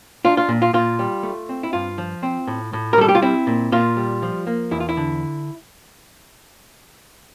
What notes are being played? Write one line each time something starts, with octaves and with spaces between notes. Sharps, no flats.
D4 F4
F4
A#2
F4
A#2 F4
G3
A3
C4
E4
G2 F4
F3
C4
A2
A2
A#4
G3 A4
G4
F4
C4 E4
A#2
A#2 F4
G3
F3
A#3
E2 E4
F4
E4
D3